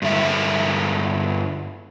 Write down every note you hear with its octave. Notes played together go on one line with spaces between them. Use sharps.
G2 D3 E4 E5